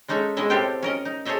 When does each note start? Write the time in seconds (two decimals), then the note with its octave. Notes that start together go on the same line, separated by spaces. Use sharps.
0.08 G#3 C#4 D#4 A4 E5
0.37 B2 G#3 E4 D#5 E5
0.50 A2 C4 F4 G4 A4 G5
0.83 C#4 A#4 D#5
1.05 D#4
1.25 G#4 A4 C5 C#5 D#5 E5